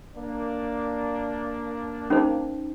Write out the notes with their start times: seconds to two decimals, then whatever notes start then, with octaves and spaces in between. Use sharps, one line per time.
0.16 A#3 D4
2.10 C#4 D#4 C5